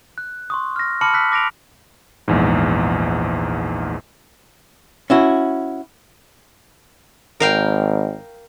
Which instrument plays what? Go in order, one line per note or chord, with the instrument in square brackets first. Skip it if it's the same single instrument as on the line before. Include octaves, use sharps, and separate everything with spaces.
[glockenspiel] F#6
C6 C#6 D#6
F6 A#6
A5 B5 D6 F6 C#7 F#7
E6 F#6 B6
D6 A#6 D7 F7
[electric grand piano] A#1 E2 G#2
[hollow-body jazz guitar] C#4 E4 F#4
[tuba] G#1 [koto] A#4 F5 G5